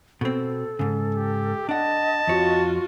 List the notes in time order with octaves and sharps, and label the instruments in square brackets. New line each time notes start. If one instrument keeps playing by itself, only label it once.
[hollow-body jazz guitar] B2 C4 [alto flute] A4
[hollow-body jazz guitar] G#2 C#3
[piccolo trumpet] G4
[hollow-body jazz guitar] D4 F#5 [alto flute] D#5 [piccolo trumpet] A5
[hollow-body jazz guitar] F2 C#5 [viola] F4 F#4